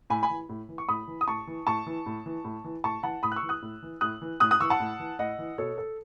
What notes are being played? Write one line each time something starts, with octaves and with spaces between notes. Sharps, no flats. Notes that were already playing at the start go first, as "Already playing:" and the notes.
A2 G#5 B5
G#5 B5
E3
A2
E3
C#6
A2 B5 D#6
E3
D#6
A2 A5 C#6
E3
A2 A5 C#6
E3
A2
E3
A2
E3
A2 A5 C#6
E3 F#5 A5
A2 B5 D#6
F#6
C#6 E6
E3
D#6 F#6
A2
E3
A2 D#6 F#6
E3
A2 D#6 F#6
D#6 F#6
E3 C#6 E6
F#5 A5
A2
E3
A2 D#5 F#5
E3
B2 A4 C#5
A4